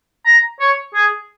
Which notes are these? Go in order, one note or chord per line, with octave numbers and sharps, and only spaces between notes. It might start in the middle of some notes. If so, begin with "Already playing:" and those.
A#5
C#5
G#4